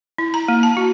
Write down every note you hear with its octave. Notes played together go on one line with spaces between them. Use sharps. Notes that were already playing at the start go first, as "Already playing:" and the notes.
E4
A#5
A#3
A5
F#4